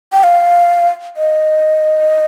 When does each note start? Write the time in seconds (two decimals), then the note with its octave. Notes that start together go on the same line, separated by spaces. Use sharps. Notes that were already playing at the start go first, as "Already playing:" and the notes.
0.13 G5
0.24 F5
1.17 D#5